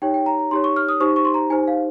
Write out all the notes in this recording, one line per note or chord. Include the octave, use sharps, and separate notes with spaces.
D#4 G4 C#5 G5
G5
A#5
A#5
D#4 G4 C#5 C6
C#6
F6
D#6
D#4 G4 C5 C#6
C#6
C6
A#5
D#4 G4 C5 G#5
F5